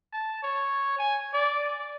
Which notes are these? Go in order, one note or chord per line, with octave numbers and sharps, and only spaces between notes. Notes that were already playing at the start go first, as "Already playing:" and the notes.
A5
C#5
G#5
D5